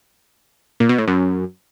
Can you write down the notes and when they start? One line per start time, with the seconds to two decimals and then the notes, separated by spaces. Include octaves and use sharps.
0.80 A#2
0.89 B2
0.98 A2
1.08 F#2